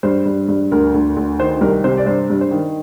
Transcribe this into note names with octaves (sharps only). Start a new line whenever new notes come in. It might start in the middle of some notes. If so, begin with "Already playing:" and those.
G2 C5
G2
G2
D2 A#4
D2
D2
D#3 C5
C2 A#4
C3 C5
D5
G2 C5
G2
C5
D#3